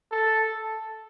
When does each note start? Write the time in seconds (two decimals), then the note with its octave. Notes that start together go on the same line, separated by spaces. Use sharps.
0.11 A4